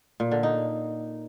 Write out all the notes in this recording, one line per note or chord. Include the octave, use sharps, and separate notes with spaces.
A#2
D3
D#4